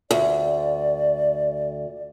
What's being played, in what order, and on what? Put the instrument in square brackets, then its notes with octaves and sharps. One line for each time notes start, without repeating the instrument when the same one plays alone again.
[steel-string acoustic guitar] D2 [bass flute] D5